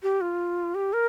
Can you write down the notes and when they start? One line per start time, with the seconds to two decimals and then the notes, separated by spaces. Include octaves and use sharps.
0.03 G4
0.21 F4
0.75 G4
0.93 A#4